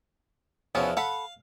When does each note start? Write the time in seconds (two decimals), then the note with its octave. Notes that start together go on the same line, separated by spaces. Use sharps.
0.75 E2 F3 B3 C#4 E4 F#4
0.97 A4 F5 F#5 B5